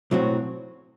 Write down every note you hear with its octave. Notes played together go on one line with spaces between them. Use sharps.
B1 A2 F#3 C4 F#4